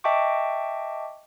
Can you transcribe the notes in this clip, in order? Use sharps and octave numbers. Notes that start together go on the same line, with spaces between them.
D#5 E5 G5 A5 C#6 D6